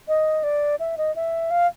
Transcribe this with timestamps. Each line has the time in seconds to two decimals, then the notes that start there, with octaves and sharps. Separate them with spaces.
0.08 D#5
0.44 D5
0.80 E5
0.98 D#5
1.16 E5
1.51 F5